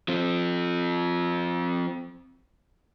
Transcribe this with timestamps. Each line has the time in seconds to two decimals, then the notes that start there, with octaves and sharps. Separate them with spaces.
0.08 F3 C4